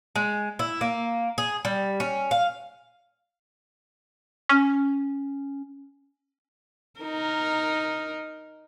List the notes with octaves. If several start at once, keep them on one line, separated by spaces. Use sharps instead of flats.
G#3
E4
A#3
G#4
G3
C#4
F5
C#4
D#4 A#4